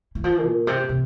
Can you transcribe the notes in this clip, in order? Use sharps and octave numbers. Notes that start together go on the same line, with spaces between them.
E3
F3
A#2
C3
C3